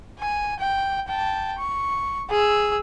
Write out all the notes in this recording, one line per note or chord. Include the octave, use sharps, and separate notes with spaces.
G#5
G5
G5 A5
C#6
G#4 E6